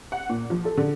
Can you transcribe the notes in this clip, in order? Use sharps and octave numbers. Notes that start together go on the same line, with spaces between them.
F#5
A#2
F3
A4
D3